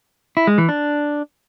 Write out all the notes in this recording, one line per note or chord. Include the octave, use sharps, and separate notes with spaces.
E4
G#3
E3
D4